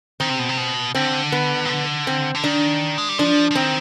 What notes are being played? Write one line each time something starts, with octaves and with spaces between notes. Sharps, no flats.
D#3 C4
C3
B2
C3
B2
D3 C4
B3
D#3
D3
C4
D3
D#3 D4
G#3
G3
F3 D4
F3
D#3 C4